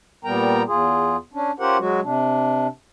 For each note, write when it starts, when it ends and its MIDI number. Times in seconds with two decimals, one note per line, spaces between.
0.25 0.63 46
0.25 0.63 55
0.25 0.63 59
0.25 0.63 70
0.25 0.63 79
0.25 0.63 82
0.67 1.16 40
0.67 1.16 65
0.67 1.16 68
1.34 1.51 61
1.34 1.51 62
1.59 1.77 61
1.59 1.77 65
1.59 1.77 67
1.59 1.77 70
1.59 1.77 72
1.59 1.77 78
1.79 2.00 54
1.79 2.00 56
1.79 2.00 66
2.03 2.67 48
2.03 2.67 62